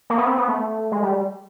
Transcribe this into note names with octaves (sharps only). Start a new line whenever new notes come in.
A#3
B3
C4
B3
A3
G#3
G3